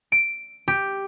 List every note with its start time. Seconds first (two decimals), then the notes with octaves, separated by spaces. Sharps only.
0.12 D7
0.68 G4